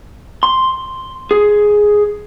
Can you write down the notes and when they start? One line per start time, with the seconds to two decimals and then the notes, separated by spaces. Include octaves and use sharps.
0.43 C6
1.31 G#4